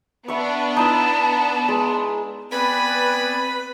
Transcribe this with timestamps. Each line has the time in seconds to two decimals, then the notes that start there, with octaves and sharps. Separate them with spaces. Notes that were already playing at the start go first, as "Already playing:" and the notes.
0.28 B3 D4 E5 C#6
0.77 D#4 E4 A5
1.68 G#3
2.52 B3 C4 B4 D5 G#5 B5